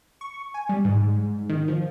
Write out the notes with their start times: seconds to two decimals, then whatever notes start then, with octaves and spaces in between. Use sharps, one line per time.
0.21 C#6
0.54 G#5
0.69 G3
0.85 G#2
1.49 D#3
1.68 F3